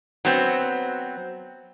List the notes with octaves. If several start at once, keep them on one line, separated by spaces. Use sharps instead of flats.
F#3 B3 C4